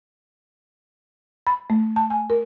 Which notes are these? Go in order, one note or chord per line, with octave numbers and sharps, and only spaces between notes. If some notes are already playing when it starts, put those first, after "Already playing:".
B5
A3
A5
G#5
A#4